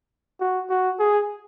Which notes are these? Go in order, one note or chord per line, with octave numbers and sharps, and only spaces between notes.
F#4
F#4
G#4